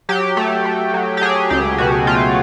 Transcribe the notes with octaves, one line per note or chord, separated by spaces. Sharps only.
F#3 G4
A3
A3
F#3
G4
F#3 G#4
C#2 G4
B2 F#4
A3 F4